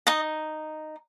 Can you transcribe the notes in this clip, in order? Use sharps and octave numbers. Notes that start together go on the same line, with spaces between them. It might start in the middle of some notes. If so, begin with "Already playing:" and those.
D#4 D#5